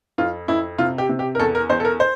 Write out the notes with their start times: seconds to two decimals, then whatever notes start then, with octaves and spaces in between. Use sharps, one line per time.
0.18 F2 F4
0.48 F2 E4
0.78 C3 F4
0.98 G4
1.09 C3
1.19 G4
1.35 A#4
1.39 E2 A4
1.55 A#4
1.69 E2 C5
1.80 A4
1.85 A#4
2.00 C5